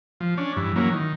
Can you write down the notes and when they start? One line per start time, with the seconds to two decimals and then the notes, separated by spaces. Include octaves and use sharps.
0.20 F3
0.37 C#4 D4
0.56 G2 E3
0.76 E3 F#3 A#3 C#4
0.92 D#3